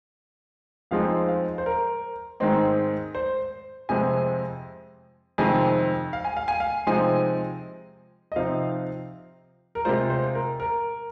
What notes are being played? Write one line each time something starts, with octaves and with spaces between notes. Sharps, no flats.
F2 F3 G#3 C4 D#4 F5
F5
C5
A#4
G#2 D#3 G#3 C4 D#4
C5
F2 C3 F3 G#3 C4 G#5
F2 C3 D#3 G#3 C4 G#5
F5
G#5
F5
G#5
F5
C3 F3 G#3 C4 D#4 G#5
D#5
C3 F3 C4 D#4 F5
A#4
C3 G#3 F4 C5
C5
A#4
A#4